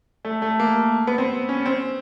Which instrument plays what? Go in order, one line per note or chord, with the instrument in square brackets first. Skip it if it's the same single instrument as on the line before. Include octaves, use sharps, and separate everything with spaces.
[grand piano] A3
A3
A#3
B3
C4
C#4
C4